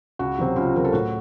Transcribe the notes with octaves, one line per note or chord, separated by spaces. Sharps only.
C#2 F#4
C3 F#3 C4
C#2 F4
C3 F#3 C4 A#4
A4
A2 F#4